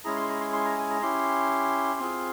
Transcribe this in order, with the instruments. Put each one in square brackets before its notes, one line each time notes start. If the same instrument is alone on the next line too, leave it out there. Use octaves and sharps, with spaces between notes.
[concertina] G#3 C#4 E4 G#4 A#5
C6
A#5
C6
C6
A#5
G#5
A#5
C#4 E4 G4 C6
C4 F4 G#4